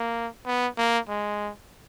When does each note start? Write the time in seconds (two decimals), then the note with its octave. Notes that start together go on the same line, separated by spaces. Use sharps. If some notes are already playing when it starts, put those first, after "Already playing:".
Already playing: A#3
0.46 B3
0.77 A#3
1.08 G#3